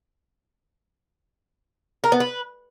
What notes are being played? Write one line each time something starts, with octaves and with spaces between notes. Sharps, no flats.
A#4
B3
B4